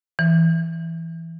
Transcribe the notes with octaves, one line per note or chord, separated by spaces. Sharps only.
E3